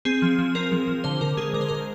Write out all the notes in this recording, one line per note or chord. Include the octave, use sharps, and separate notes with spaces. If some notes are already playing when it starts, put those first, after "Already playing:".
C4 G#4
F3
F3
C4 A#4
F3
F3
D3 C5
D3 A#4
G#3 G#4
D3 A#4
C5
D3 A#4